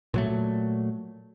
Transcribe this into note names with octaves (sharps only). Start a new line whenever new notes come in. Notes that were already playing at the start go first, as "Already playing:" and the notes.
A#2 F#3 A3